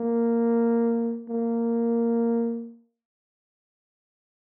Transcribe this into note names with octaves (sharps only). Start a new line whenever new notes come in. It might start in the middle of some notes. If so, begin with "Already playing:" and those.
Already playing: A#3
A#3